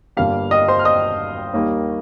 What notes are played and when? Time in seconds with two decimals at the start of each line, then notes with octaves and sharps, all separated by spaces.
0.17 G1 G2 G3 A#3 F5 F6
0.51 D#5 D#6
0.68 C5 C6
0.79 F6
0.85 D#5 D#6
1.53 D#2 D#3 G3 A#3